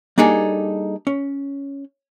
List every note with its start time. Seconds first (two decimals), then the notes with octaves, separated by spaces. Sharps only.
0.18 G3 A#3 D4 D#4 G#4 A4
1.07 C#4